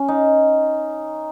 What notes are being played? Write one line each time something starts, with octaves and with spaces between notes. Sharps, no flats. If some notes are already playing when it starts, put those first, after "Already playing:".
Already playing: C#4
D#4